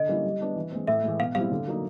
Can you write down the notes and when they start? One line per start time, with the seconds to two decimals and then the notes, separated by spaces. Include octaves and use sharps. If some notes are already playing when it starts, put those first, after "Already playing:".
Already playing: D3 D#5
0.09 G3 A#3 C#4 E4
0.24 G3
0.41 B3 D4
0.56 E3
0.72 G#3 C4
0.87 A2 E5
1.04 E3 G#3
1.20 B2 F5
1.35 G3 C4 E4 F5
1.51 D3
1.67 F#3 A#3 D#4